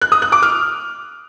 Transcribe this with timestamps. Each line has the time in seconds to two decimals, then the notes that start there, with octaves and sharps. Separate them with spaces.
0.02 F#6
0.12 D#6
0.22 F#6
0.32 D6
0.42 F6